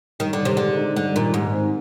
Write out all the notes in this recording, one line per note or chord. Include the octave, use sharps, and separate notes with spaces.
G2 D#3
D3
D#3
C3
D3 G#3
D#4
G2 D3
A#2 D#3
G#2 G3
C4